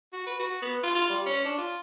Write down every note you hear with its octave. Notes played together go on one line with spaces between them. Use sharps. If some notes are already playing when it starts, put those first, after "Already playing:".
F#4
B4
F#4
B3
F4
F4
G3
C#4
D4
F4